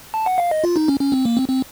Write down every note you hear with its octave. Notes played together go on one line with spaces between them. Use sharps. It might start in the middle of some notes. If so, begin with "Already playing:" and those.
A5
F#5
F5
D#5
F4
D#4
C#4
C#4
C4
A#3
C4
C4